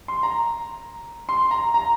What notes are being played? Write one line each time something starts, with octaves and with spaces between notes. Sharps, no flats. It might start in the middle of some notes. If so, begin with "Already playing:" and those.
C6
A#5
C6
A#5
A#5